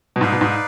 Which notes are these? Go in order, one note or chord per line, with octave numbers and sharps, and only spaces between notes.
B2
G#2 D#4 B4 D5 F5
B2
G#2